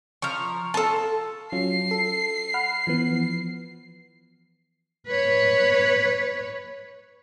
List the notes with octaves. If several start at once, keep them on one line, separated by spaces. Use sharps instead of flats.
F3 A#5 C#6 F6
F4 A4 A5
F#3 C#4 F4 C7
A4
F#5 B5 F6
E3 F3 B3
B4 C#5